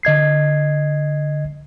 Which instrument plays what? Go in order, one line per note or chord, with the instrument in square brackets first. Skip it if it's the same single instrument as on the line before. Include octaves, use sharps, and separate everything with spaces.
[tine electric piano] D3 D#5 G#6 C7